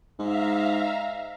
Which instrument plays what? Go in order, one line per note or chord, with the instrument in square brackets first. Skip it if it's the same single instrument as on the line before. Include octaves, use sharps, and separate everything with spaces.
[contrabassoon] G#2 [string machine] E5 F5 A#5